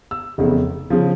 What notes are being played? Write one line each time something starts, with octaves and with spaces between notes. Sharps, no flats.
E6
F1 E2 C#3
C#3 F3